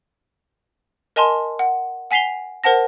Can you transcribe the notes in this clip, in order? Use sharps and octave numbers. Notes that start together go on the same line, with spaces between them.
A#4 D#5 G#5 A5 C6
F#5
F#5 G#5 B6 C7 F7 G7
A#4 C5 F#5 A5 A#6